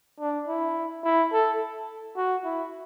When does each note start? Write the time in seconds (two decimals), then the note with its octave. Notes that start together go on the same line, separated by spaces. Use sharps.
0.20 D4
0.48 E4
1.04 E4
1.33 A4
2.17 F#4
2.45 E4